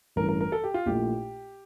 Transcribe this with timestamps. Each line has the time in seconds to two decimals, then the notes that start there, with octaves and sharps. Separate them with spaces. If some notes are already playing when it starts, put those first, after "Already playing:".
0.16 A1 G2 E3 A3 C#4 A#4
0.29 A#4
0.41 A#4
0.52 A4
0.64 G4
0.74 F4
0.86 A#1 A#2 A3 E4 G4